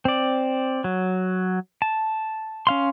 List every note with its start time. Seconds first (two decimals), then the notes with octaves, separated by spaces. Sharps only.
0.05 C4 D5
0.84 F#3
1.82 A5
2.67 C#4 F5 C6